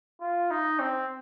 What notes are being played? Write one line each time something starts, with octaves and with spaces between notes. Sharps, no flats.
F4
D#4
C4